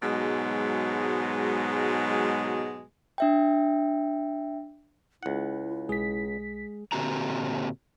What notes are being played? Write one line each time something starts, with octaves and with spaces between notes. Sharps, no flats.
G#2 B2 F#3 G#3
D4 E5 G5
C#2 E4 F#5
B1 G#3 G#4 B6
A#2 D3 C4 F#4 G4 A#5